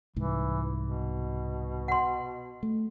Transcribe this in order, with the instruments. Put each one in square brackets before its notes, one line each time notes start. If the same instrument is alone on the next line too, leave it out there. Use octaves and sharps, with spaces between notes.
[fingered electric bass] C2 G#2 [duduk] E3
[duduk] B2
[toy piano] F#5 C6
[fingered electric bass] A3